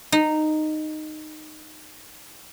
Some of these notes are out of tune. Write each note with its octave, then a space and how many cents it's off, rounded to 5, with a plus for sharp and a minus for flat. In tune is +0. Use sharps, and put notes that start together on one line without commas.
D#4 -10